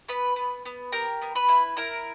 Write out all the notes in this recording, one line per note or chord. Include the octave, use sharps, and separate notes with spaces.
B3 B4 B5
B3
B3
G4 A#4 A#5
B3
B4 B5
E4
E4 A#4 A#5